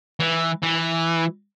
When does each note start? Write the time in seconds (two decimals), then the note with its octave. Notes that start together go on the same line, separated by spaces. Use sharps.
0.20 E3
0.63 E3